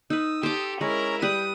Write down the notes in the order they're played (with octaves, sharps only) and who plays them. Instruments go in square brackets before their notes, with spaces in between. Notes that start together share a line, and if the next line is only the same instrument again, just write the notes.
[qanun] D#4 B4 [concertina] D#6 E6
[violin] G4 A4 [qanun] C5 D6
[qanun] G#3 [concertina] C#4 A#5 [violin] E4 A#4
[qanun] G3 B4 [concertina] G5 [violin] D#6